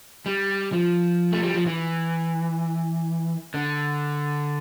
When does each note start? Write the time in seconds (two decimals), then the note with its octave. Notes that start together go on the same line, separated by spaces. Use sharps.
0.26 G3
0.72 F3
1.32 A3
1.43 G3
1.55 F3
1.66 E3
3.54 D3